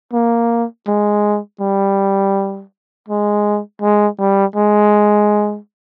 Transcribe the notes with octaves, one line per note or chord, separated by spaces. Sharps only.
A#3
G#3
G3
G#3
G#3
G3
G#3